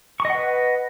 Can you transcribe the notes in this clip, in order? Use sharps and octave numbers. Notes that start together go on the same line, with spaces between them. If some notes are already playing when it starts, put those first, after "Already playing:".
B4 D#5 F#5 C#6